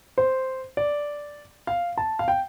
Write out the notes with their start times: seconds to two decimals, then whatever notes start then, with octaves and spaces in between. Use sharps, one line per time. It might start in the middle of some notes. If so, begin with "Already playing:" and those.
0.18 C5
0.77 D5
1.67 F5
1.97 A5
2.19 F5
2.28 G5